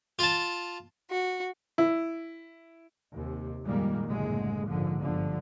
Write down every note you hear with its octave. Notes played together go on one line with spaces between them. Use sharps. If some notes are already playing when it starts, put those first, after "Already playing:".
F4 A5
F#4
E4
D#2 C3
F2 A#2 D#3 G3 G#3 A#3
F#1 C2 A2 D3 G#3
A#1 G#2 D3 F3
G1 D3 F3